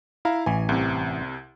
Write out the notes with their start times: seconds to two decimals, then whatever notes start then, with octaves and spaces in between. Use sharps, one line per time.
0.25 E4 F5 A#5
0.46 A1 E3 G#5
0.69 C2 C3